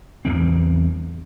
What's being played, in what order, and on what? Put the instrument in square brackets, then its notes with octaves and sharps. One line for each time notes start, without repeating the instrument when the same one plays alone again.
[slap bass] A1 E2 E3 C4